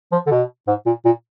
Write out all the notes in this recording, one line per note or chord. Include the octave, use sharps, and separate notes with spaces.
F3
D3
B2
G#2
A#2
A#2